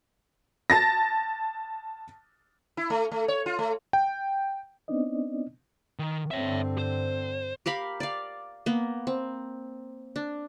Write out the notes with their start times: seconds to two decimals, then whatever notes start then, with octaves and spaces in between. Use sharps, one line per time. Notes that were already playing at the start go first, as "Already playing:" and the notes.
0.70 A5 A6 A#6
2.77 E4
2.90 A3
3.12 A3
3.28 C#5
3.46 F4
3.59 A3
3.93 G5
4.88 B3 C4 D4 D#4 D5 D#5
5.99 D#3
6.31 G2 D3 C4 C#5 E5
6.78 C5
7.66 G4 A#4 F5 B5
8.00 D5 F5
8.66 A#3 B3
9.07 C4
10.16 D4